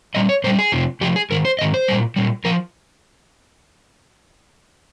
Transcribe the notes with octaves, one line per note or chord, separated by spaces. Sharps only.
A#2 G3 D#5
C#5
A#2 G3 C5
G#4
F2 C3 F3
F2 C3 F3 G4
G#4
G#2 D#3 A#4
C5
G#2 D#3 D#5
C5
A#2 G3
A#2 G3
F3 A#4